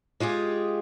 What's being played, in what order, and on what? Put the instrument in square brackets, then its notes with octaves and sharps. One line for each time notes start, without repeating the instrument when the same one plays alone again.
[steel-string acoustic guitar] G#3 F4 G4 G#4